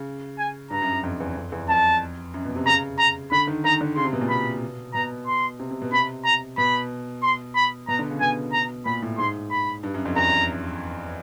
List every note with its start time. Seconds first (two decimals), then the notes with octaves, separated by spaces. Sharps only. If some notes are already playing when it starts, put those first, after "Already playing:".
Already playing: C#3
0.38 G#5
0.70 G2 A#5
0.82 F#2
0.93 F#2
1.03 F2
1.20 E2
1.36 F2
1.52 E2
1.69 F2 A5
2.34 F#2
2.45 B2
2.56 C3
2.66 C#3 A#5
2.99 A#5
3.32 D3 B5
3.47 D#3
3.64 D#3 A#5
3.81 D3
3.96 C#3 C6
4.05 C3
4.13 B2
4.21 A#2
4.29 B2 B5
4.94 B2 A#5
5.27 C6
5.60 C3
5.71 C3
5.82 B2
5.92 C3 B5
6.24 A#5
6.58 B2 B5
7.23 C6
7.55 B5
7.88 B2 A#5
7.99 D3
8.09 C#3
8.20 B2 G#5
8.53 A#5
8.86 A#2 B5
9.02 A2
9.18 G#2 C6
9.51 B5
9.83 G2
9.94 F#2
10.05 F2
10.16 E2 A#5